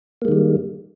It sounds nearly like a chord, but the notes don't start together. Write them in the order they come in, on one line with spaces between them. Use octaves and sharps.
A#3 G#3 D#3 G3